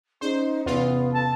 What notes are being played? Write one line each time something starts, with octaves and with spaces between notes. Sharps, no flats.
C#4 D#4 G#4 C5 D5
E2 C3 B3 F4 F5
A5